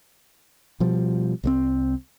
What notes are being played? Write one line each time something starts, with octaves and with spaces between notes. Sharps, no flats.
B2 F3 G3
C2 G#3 C4